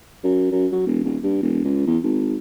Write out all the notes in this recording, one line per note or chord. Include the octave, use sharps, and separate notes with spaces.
F#2
F#2
F#3
E1
D#1
G2
E1
C#2
E2
G#1